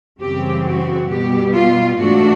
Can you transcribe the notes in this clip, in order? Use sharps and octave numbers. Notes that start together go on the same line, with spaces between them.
F#2 C#3 E3 G3 C4 G4
F#4
B2 G3 B3 G4
F4
G#2 E3 A3 D4 F#4